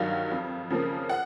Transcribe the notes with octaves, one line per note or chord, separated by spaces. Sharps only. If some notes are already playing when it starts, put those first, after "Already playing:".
Already playing: G2 D#3 F#3 F5
F2
C#3 F3 A#3
F#5